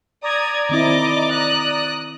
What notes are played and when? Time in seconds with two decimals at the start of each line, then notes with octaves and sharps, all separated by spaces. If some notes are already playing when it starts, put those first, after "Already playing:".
0.23 D5 A#5 D#6 G#6
0.69 D#3 C4 E4 D#5 D6
1.31 D#6 F#6